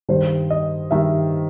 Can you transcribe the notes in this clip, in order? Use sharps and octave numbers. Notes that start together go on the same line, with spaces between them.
G2 D#3 G3 C5
D#5
G2 D#3 G3 E5